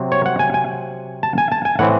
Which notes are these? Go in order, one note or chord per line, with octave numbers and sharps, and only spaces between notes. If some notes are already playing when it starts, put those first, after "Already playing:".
Already playing: C3 F#3 C4
C#5
F#5
G#5
G#5
A5
G#5
A5
G#5
A2 E3 C4 F#5